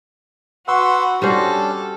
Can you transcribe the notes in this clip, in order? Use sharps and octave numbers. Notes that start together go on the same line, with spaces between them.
F#4 B4 F#5 C6 C#6 E6
G3 C#4 D4 F#4 A4 C5